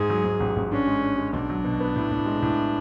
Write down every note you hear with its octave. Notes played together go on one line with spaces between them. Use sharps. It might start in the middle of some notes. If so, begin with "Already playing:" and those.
Already playing: G#2 G#4
F#3
G#2
A1
A1
C#4 D4
G#3
D4
G#3
B1 D4
F#3
B2
B3
A2
A2
G#3
A2